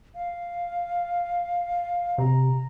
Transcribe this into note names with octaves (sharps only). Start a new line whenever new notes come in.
F5
C3 A#5